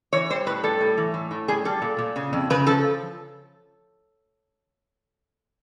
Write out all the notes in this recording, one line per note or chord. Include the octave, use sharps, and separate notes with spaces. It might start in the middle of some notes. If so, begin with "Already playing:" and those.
E3 C#5
G3 C5
A2 B4
G3 A4
A2
E3
A2
A2
G3 G#4
G3 A4
A#2
A#2
C#3
F2
C#3 B4
F3 A4